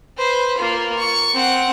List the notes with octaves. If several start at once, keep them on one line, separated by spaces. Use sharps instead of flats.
B4 C5
A#3 F4
C#6
C4 F#5